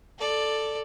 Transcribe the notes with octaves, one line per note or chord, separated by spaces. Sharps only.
A4 D5